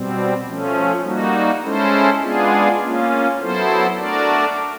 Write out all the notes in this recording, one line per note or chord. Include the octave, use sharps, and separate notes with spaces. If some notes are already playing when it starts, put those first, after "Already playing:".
Already playing: B2 G3 C4
F3 A3 C#4
G3 A#3 D#4 F#4
G#3 C#4 E4 A4 C5
G#3 B3 D4 F4 G#4
A#3 C#4 F4
F#3 B3 E4 A4 C5
A3 D4 F#4 A#4 D5